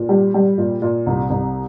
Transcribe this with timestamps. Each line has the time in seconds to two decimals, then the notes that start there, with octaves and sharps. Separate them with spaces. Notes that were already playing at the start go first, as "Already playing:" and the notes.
Already playing: A#2
0.09 G3
0.34 G3
0.58 A#2
0.82 A#2
1.06 C2
1.30 C2